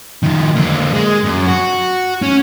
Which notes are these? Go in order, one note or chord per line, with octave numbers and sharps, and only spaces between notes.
D#3 F3
D3 A#3
G#3
F#2
F#4
C#4